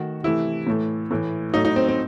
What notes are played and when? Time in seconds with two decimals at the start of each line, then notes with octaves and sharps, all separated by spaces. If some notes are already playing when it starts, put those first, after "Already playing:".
Already playing: D#3 A3 F#4
0.23 C3 E3 A3 E4
0.67 A2 E3 A3
1.11 A2 E3 A3
1.54 A2 F#3 A3 D#4
1.65 D#4
1.76 C4
1.88 C4